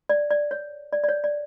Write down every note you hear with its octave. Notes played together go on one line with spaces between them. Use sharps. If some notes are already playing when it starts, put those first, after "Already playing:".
D5
D5
C#5
D5
D5
C#5
D5